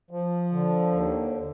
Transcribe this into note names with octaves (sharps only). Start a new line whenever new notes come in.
F3
D3
D#2